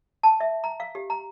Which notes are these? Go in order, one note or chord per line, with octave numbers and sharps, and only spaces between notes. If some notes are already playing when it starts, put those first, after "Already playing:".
A5
E5
A#5
F5
G4
A#5